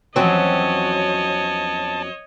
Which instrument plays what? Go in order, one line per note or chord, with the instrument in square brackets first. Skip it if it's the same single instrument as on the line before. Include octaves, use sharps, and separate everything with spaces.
[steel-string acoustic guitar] E2 F3 C#4 [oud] F#3 C4 [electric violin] C#5 D#5 [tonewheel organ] A5